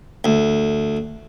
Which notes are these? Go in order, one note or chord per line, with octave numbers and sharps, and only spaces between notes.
D2